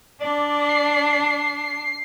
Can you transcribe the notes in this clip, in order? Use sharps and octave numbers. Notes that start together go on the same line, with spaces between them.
D4 D5
C7